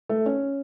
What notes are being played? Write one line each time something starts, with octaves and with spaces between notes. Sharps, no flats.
A3
C#4